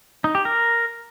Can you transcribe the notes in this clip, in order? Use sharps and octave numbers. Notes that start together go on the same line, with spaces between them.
D#4
G4
A#4